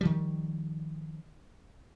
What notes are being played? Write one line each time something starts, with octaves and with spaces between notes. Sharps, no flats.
D#3 F3 G3